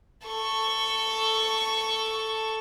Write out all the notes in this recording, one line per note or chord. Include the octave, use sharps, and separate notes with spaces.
A4 C#6